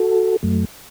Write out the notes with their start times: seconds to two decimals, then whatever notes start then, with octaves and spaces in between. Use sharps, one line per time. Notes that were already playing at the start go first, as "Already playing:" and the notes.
Already playing: F#4 A4
0.43 F#2 F#3 A3